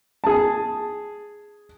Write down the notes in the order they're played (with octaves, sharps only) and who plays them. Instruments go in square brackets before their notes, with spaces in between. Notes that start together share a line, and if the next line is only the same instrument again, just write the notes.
[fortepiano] G#4 A5